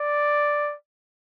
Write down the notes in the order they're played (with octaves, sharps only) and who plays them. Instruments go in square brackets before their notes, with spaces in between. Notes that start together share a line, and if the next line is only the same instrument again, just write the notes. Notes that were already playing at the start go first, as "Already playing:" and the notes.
Already playing: [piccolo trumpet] D5